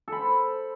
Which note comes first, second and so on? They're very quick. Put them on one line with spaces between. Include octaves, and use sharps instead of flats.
A4 B5 C5